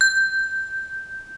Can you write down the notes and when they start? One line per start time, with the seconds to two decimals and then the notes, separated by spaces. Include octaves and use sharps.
0.01 G6